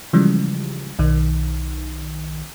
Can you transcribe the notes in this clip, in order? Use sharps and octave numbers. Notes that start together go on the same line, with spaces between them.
C#3 E3 F3 G3 G#3
B1 D#3